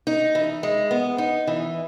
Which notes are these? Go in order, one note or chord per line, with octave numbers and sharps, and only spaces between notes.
D#4
E3
G#3
B3
D#4
E3